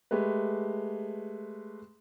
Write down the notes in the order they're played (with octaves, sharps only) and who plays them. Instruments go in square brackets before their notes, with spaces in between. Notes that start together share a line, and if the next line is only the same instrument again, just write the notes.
[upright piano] G#3 A3 G4 B4